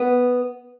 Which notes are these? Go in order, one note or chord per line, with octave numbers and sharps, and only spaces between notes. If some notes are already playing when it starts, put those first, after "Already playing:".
Already playing: B3